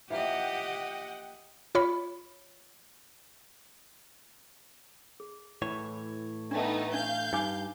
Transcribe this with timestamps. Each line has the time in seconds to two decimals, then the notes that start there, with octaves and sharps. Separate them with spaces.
0.10 E3 F3 A#3 G4 D#5 F#5 G5
1.75 F4 C#5 B5
5.20 G#4
5.62 A2 E3 C#5
6.51 A3 B3 D4 D#4 G5
6.94 D4 F5 G6
7.33 G2 D#4 G#5 D6